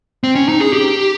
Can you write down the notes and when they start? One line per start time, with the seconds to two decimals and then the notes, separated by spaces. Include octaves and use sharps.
0.24 C4
0.35 C#4
0.49 D#4
0.60 G#4
0.73 G4